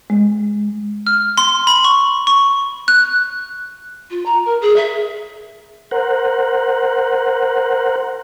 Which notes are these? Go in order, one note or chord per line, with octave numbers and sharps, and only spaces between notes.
G#3
F6
C6
B5
C#6
C#6
F#6
F4
A#5
A#4
G#4
E5
A#4 C5 F#5